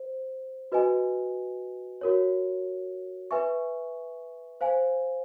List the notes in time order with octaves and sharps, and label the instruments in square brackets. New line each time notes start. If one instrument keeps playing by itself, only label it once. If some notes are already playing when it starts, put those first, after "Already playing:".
Already playing: [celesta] C5
F#4 B4 D#5 G#5
F#4 A#4 C#5
B4 E5 G#5 C#6
C5 F5 G#5